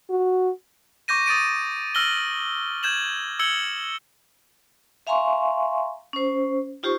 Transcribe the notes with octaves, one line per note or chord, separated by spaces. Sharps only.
F#4
C#6 D6 G6 A#6 D#7
D#6 A6 D7 D#7
E6 F6 A#6 F#7 G7
G6 G#6 E7 F#7
E6 G#6 C#7 F#7 G7
E5 F5 G#5 A#5 C6 C#6
C#4 C5
D#4 F4 G4 C5 C#6